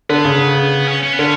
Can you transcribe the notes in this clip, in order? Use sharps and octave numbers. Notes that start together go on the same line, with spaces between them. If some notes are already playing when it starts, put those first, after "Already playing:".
D3 B3
C#3
C#4
C#4
B3
D3 C#4